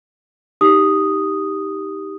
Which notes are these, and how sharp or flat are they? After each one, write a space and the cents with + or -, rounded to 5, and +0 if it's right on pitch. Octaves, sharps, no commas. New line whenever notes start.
D#4 +15 G4 +0 D#6 +0